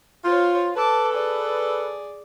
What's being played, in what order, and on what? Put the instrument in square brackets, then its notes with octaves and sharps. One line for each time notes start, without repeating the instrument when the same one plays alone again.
[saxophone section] F4 [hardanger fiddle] C5 C#5
[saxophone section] A4 B4 [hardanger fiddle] A5 D6
[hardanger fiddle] G#4 D5